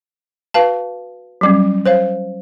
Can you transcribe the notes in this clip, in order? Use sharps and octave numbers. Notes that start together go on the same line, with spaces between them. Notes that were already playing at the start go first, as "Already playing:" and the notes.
F#4 B4 F5 A5
F#3 G3 C#4
C5 C#5 F5